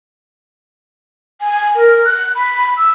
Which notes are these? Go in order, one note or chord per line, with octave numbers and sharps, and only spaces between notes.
G#5
A#4
F#6
B5
E6